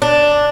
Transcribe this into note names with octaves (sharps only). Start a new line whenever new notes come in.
D4